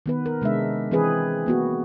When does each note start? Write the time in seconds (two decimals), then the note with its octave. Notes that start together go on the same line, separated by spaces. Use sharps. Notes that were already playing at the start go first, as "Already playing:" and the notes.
0.06 D#3 B3 B4
0.26 A#4
0.41 C3 G#3 D4 E5
0.91 E3 C4 G#4 B4
1.46 A#3 B3 F#4